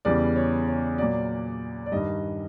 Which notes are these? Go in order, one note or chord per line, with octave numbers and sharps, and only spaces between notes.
E2 C#3 E3 G3 D5
C#5
C#5
A#2 F#3 D5
D5
G2 D#3 G3 D#5